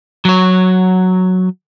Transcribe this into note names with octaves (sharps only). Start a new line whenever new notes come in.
F#3 C#5